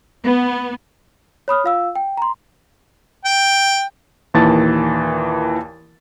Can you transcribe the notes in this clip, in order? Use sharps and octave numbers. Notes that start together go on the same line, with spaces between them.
B3
C#5 B5 D#6 F6
F4 F5 E6
G5
A#5 C6
G5
D#2 A#2 E3 A5 A6